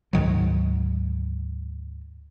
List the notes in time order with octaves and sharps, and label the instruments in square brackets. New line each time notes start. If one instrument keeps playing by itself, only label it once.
[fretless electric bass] D2 G#2 D#3 F#3